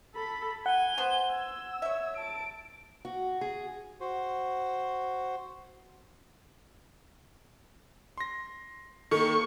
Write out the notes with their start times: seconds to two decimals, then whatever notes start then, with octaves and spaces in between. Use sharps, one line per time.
0.15 A4 B5 B6
0.66 F#5 G#5 G7
0.98 B3 C5
1.32 E6 G#6
1.82 C#5 E5 G#6
2.17 A5 D7
3.05 F#4
3.41 G#4
4.00 F#4 C5
8.18 C6 A#6
9.11 D#3 A#3 A4 C#6